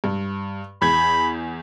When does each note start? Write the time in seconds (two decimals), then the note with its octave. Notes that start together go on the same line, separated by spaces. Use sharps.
0.04 G2
0.82 E2 B5 G6 G#6